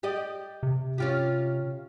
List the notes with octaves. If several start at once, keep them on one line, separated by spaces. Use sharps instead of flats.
G4 D5 D#5
C3
C#4 F4 G4